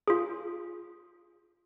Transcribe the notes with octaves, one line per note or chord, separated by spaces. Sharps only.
F4 G#4